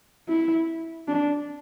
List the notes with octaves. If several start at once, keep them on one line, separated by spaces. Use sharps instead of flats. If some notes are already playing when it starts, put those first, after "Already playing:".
E4
D4